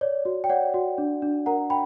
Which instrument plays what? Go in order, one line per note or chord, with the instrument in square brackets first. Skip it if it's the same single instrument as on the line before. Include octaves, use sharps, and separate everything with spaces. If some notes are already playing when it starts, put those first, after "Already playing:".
[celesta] C#5 D5
F#4
G5
C#5 D5 F#5
F#4
D4
D4
A#4 F#5 A#5
G5 B5